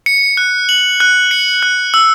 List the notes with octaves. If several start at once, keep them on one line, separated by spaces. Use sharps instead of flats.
C#7
F#6
F#7
F#6
C#7
F#6
E6